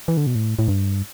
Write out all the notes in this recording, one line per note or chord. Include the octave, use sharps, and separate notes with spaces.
E3
D3
B2
A2
A2
G2